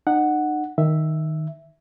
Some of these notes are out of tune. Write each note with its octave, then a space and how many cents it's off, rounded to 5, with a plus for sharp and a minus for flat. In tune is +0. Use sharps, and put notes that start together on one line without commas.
D#4 -40 F#5 +0
D#3 +0 E5 +0